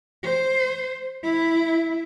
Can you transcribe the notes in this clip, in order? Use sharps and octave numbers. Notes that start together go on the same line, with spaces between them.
C5
E4